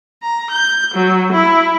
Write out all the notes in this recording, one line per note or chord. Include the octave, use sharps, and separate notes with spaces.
A#5
G6
F#3
E4